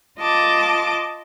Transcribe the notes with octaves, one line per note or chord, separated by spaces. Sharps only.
F4 D#5 A5 D6